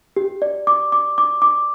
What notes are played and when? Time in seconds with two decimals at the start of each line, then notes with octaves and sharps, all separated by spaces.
0.16 G4
0.42 D5
0.67 D6
0.92 D6
1.18 D6
1.42 D6